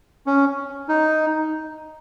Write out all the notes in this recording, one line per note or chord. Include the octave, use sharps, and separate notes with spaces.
C#4
D#4